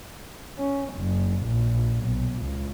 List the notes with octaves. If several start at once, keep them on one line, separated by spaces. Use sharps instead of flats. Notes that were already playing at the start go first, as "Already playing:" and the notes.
C#4
F#1
A#1
B1
C#2